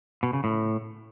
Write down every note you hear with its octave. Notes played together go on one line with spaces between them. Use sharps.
B2
C#3
A2